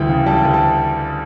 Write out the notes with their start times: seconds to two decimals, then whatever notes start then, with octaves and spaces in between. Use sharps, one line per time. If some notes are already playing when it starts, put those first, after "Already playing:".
Already playing: D2 E3 G3 G5
0.09 C#3
0.26 G3 A5
0.45 D2
0.54 A5